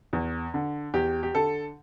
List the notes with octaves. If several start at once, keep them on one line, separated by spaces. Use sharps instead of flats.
E2
D3
E2 G4
G4
D3 A4